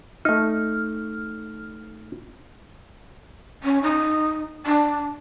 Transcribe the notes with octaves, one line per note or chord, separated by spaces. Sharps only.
A3 D#4 F6
C#4
D#4
D4